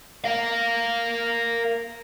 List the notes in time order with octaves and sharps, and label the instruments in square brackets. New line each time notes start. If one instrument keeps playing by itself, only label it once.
[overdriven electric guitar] A#4 F5